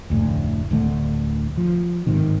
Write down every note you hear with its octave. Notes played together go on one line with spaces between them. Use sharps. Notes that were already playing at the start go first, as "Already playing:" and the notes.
F1 D2 A2
D1 D2 D3 A3
F3
G1 G#2 C3 D#3